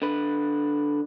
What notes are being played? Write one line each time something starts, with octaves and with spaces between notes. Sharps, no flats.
D3 B4